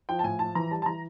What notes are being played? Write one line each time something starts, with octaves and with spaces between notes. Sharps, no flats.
F3 G5
A5
A2 G#5
F3 A5
E3 A#5
G3 A5
A5
E3 A#5